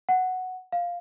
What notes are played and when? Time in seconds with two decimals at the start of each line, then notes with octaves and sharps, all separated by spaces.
0.09 F#5
0.72 F5